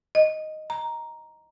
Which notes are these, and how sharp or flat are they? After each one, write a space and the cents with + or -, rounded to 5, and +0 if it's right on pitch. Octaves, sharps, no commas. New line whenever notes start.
D#5 +0
A#5 +5